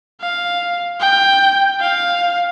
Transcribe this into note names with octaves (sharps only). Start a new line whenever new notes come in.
F5
G5
F5